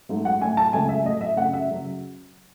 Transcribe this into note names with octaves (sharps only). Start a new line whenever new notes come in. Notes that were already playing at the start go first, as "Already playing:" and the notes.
G#2 F#3 A3
F#5
A2 F#3 A3 G#5
A5
C#2 C#3 F#3 A3 G#5
E5
A2 F#3 A3 D#5
E5
F#2 C#3 F#3 A3 F#5
E5
C#3 F#3